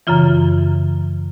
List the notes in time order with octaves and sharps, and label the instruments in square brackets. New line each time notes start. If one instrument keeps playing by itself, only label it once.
[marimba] F#2 C#3 E3 F4